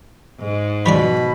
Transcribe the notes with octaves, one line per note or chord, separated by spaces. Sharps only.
G#2
B2 F3 G#3 D5 B5